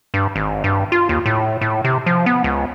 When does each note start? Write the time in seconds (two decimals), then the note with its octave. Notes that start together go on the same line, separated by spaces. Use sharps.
0.14 G2
0.36 G#1
0.64 G2
0.92 F4
1.09 D#2
1.26 A2
1.61 A2
1.84 C3
2.06 F3
2.26 B3
2.44 C#2